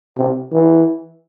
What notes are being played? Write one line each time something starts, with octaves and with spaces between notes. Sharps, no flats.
C3
E3